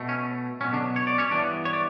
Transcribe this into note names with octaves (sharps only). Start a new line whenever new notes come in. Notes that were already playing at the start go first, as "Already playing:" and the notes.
Already playing: B2 A3
C#4
B2 F#3 B3 C#4
D3 D4
C#5
D5
C#4 C#5
G2 E3 B3 D4 D5
C#5
D5